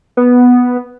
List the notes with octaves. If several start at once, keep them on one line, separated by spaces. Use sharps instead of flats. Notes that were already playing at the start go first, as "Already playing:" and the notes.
B3